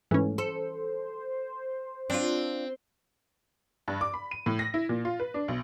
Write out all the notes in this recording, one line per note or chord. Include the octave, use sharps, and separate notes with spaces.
G#2 E3 A3 C#4
A4 C5
C4 D4 F4
G2
D6
B5
D#7
A2
A#6
E4
A#2
F4
B4
D4
B1